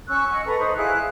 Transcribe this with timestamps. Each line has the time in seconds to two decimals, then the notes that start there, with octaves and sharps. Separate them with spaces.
0.08 C#4 C#6 E6 F#6
0.30 D#5 F#5 G#5
0.46 A4 B4 A#5 C#6
0.58 D#4 C5 B5
0.75 E4 G#4 F5 F#6